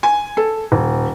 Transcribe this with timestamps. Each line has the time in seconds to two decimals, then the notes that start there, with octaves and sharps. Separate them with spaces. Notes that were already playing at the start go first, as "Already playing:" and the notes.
0.03 G#5
0.37 A4
0.72 D#1